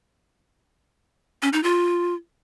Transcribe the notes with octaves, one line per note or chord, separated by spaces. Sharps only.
C#4
D#4
F4